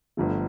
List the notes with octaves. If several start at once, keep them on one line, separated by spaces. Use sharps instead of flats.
G1 G2 F3 A3